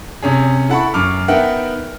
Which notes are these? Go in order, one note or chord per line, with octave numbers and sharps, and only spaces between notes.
C3 C#4 G#4
E4 A4 F#5 A5 B5 C#6
F#2 C#6 D6 F6
B3 D#4 A#4 E5 F#5 G5